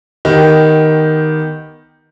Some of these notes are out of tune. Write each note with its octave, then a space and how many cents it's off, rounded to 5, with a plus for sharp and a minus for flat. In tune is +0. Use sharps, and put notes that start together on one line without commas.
D#3 +0 B3 +0 G4 +0